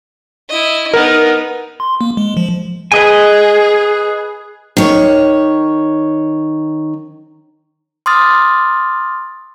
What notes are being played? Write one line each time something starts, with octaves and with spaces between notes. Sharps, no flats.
E4 D#5
B3 D#4 A#4
C6
A#3
G#3
F3
G#4 B4 D#5 G#5
D#3 C#5
C6 D6 D#6 F6 A6